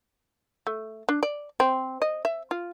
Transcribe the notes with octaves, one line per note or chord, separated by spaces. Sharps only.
A3
D4
D5
C4
D#5
E5
F4